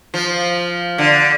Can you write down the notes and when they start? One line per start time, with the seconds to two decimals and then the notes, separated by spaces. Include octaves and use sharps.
0.14 F3
0.98 D3